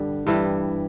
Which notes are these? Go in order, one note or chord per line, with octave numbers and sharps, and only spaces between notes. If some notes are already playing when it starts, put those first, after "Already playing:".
Already playing: G2 D3 G3
G2 E3 G3